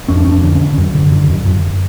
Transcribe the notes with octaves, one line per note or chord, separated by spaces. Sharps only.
F2 C#4
D4
F2 C#4
D4
D3
C#4
D3
F#2
D3
D3
F#2
F#2